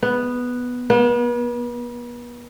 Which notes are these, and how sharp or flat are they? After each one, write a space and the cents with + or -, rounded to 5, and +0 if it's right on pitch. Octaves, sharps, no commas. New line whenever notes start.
B3 +0
B3 -40